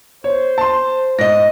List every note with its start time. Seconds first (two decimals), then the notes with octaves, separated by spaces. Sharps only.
0.24 C5 C#5
0.58 A5 C6
1.19 G#2 D#5 A#6